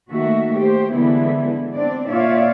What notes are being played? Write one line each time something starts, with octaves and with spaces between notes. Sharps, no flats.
D#3 A3 A#3 F#4 E5
G4 C5
D3 E3 G#3 B3 E4
C4 D4 D5
A#2 F4 C#5 D5 E5 F5